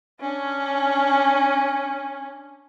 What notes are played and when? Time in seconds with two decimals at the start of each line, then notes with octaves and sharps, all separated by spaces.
0.21 C#4 D4